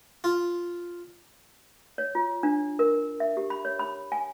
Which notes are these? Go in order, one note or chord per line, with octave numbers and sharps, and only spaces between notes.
F4
C#5
F4
D4
A#4
E5
G4
B5
C#5
B5
G#5